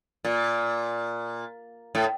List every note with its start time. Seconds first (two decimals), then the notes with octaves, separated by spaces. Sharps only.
0.25 A#2
1.95 A2